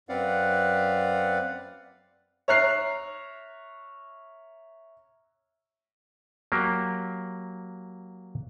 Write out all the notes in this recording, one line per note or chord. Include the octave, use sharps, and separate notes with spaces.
F#2 C4 B4 D5 F5 F#5
C#5 E5 A#5 F6 F#6 C7
F#3 A#3 G4